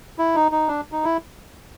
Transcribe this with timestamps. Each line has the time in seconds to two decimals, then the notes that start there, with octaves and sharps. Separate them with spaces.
0.19 E4
0.35 D#4
0.52 D#4
0.68 D4
0.92 D#4
1.04 E4